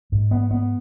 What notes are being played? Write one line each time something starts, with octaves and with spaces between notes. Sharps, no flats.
G#2
B3
B3